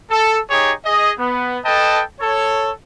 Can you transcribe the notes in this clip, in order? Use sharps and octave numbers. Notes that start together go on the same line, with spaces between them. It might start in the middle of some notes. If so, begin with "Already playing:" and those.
A4
D#4 G4 G#4 C#5
G#4 D#5
B3
A4 B4 D#5 G5 A5
A4 C#5